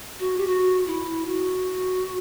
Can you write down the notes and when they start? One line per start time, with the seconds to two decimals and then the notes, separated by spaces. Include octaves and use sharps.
0.19 F#4
0.37 G4
0.46 F#4
0.86 E4
1.26 F#4